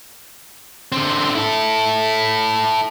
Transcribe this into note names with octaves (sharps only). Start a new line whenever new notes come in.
D3 C4
E4 A4